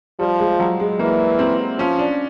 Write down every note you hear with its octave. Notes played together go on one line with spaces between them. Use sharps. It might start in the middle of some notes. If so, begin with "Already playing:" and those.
F3 G3
G#3
F#3
G#3
E3 A#3
C4
F3 C#4
D4